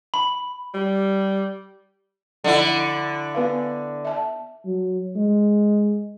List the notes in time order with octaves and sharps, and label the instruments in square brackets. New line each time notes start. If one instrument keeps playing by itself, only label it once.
[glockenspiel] B5
[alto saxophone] G3
[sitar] D3 E4 [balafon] F3
[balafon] B3 B4 F5
E5 A5
[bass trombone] F#3
G#3